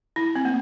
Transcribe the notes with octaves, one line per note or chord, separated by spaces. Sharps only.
E4
C4
A#3